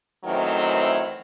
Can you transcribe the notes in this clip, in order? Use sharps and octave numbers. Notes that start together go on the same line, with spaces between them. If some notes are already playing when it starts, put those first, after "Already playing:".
F#2 D#3 E3 F#3 A3 C4